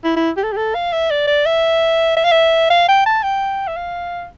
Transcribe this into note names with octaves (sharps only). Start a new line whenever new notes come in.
E4
E4
G4
A4
G4
A4
F5
E5
D5
D5
E5
E5
F5
E5
F5
G5
A5
G5
E5
F5